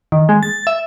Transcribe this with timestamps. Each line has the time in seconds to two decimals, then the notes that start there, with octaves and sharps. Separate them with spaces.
0.12 D#3
0.29 G#3
0.43 A6
0.67 E5